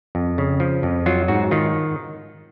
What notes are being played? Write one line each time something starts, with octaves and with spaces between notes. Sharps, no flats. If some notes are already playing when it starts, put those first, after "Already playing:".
F2
C#3
F3
F2
F#3 F4
G#2 F#4
D#3 F4